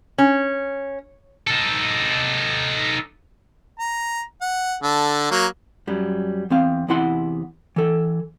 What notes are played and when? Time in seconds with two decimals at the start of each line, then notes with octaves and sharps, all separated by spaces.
0.18 C#4
1.47 D#4 A4
3.79 A#5
4.41 F#5
4.83 D3 A4
5.31 F#3 A#3 C#5
5.87 F#2 F#3 G3
6.50 E2 C4 F5
6.88 E2 C3 E3 E4 F#5 C6
7.76 E3 A4